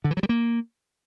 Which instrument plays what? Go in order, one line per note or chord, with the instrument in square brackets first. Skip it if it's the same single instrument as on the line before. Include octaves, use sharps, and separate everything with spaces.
[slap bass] D3
E3
F#3
G3
A#3